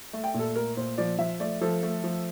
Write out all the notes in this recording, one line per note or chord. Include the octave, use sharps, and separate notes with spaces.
A3
G5
A#2
A4
A3 A#4
A#2 C5
F3 D5
F3 E5
A3 D5
F3 A4
A3
F3